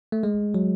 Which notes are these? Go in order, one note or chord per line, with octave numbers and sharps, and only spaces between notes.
A3
G#3
F#3